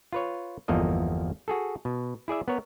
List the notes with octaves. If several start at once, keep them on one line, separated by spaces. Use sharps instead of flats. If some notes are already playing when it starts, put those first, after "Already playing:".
F4 B4 C#5
G1 E2 F3 A#3 A4 D#5
F#4 G#4 A4
B2
E4 G#4 D5 E5
B3 A#4 C#5